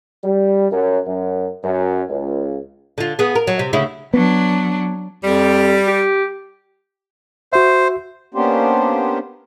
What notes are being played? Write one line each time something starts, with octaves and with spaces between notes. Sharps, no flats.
G3
F#2
F#2
F#2
C#2
D3 F4
B3 G#4
A#4
F#3
C3
D2 C#3 E4
F#3 B3 D4
F2 G3
G4
F#4 C5 E5
A#3 B3 C#4 D4 G4 C5